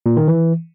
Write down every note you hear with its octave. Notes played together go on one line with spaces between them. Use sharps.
A#2
D#3
E3